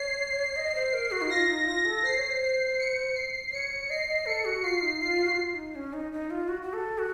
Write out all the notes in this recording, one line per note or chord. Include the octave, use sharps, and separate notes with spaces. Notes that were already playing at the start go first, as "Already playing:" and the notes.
Already playing: C#5 C7
D#5
C5
A#4
F#4
D#4
F4 A#6
D#4
F4 A#6
A4
C5 C7
C#5
C5
C7
C#7
C7
C#5 C#7
C#5
C#5
D#5 C7
D#5
A4 C#7
F#4
F4 C7
D#4
F4 C7
F#4
F4
F4
D#4
C#4
D#4
D#4
F4
F#4
F#4
A4
F#4